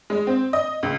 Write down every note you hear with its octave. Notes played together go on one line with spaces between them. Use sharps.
G#3
C4
D#5
C#2